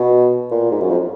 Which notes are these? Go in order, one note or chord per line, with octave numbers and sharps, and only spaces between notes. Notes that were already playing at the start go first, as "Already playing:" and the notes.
Already playing: B2
A#2
G#2
F#2
F2